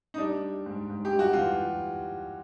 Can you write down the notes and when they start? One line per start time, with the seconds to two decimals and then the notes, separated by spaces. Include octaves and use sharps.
0.14 D#4
0.18 G3 D4
0.41 G3
0.66 G#2
0.89 G#2
1.05 G4
1.13 G3
1.19 F#4
1.33 E3 F4